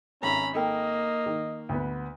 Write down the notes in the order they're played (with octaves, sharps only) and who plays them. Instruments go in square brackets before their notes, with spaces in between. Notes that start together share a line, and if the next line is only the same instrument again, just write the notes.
[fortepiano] G#1 [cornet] C#4 [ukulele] A4 E5 G#5 [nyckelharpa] A#5 B5
[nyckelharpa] A#3 [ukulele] D#4 A4 G5 [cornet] D#5
[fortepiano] D#3
D2 B3